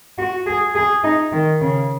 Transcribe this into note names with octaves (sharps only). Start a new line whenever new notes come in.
F#4
G#4
G#4
D#4
D#3
C#3